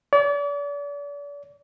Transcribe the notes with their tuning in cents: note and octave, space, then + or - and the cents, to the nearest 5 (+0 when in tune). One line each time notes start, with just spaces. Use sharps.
D5 -40